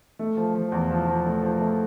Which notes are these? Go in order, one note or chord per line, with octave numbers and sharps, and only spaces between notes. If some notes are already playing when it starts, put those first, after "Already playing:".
A3
F3
F3
E2
F3
F3
A3
F3
A3